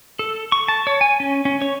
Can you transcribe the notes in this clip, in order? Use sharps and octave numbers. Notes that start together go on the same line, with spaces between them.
A4
C#6
A5
C#5
G#5
C#4
C#4
C#5